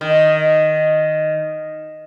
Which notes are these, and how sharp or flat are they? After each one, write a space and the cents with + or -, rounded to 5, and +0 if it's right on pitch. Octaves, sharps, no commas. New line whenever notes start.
D#3 -5